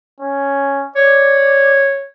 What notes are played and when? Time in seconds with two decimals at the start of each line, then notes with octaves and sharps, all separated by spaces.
0.20 C#4
0.96 C#5 D5